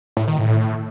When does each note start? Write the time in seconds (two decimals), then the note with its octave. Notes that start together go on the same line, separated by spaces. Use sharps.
0.17 A2
0.28 D#3
0.39 A2